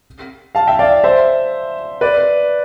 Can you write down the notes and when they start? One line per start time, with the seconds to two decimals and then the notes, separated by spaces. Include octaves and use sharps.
0.55 F5 A5
0.67 E5 G5
0.79 D5 F5
1.04 C5 E5
2.01 B4 D5